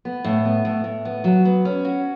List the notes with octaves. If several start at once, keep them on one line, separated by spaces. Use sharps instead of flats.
B3
A2
B3
A2
A2
B3
F#3
B3
C#4
F#4